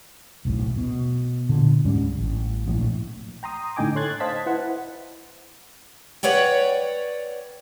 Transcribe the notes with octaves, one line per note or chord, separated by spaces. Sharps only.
D#1 B1 A2
B2
A#2 D3
C#2 G#2 G3 C#4
A1
D1 A#1 A2
G5 A#5 C6 D#6
A2 D3 D#4 G5 G#5 D6
A4 C#5 C6 F#6 G#6 A6
C5 D#5 F5 A5 B6
E4 B4 C5 F#5
B4 C#5 D5 F#5 G5